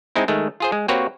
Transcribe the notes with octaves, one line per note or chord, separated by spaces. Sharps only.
G#3 C4 D#4 E4
D#3 G#3 A3
F4 G#4 C5
G#3
A#3 C4 F#4 G4 B4 C#5